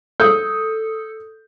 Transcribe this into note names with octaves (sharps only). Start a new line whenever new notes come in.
A4 D#6 G6